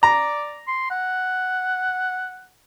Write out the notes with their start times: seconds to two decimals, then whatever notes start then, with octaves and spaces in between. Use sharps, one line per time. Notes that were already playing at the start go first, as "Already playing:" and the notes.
0.03 D5 A#5
0.67 C6
0.90 F#5